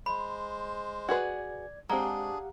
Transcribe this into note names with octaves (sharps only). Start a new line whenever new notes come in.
G#3 C5 B5
F#4 G#4 B4 D5 G#6
G#3 C4 D4 G4 G#4 F5 F#5 A#5